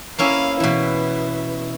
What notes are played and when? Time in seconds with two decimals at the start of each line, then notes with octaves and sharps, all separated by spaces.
0.19 A#3 C#4 E4 F5
0.60 B2 E3 E4